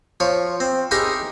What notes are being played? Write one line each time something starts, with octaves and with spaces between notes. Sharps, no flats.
F3 C#5
C4
D#4 E4 G4 G#4 A#4 G5